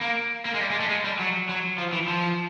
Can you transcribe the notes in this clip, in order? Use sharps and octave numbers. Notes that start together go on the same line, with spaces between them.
A#3
A#3
G#3
G3
G#3
A3
G#3
G3
F#3
F#3
F3
E3
F3